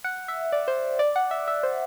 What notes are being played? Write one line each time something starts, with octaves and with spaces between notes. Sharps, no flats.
F#5
E5
D5
C5
D5
F#5
E5
E5
C5